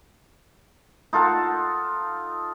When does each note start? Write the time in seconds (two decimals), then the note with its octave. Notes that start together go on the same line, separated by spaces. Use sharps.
1.13 D#4 F4 A4 F#5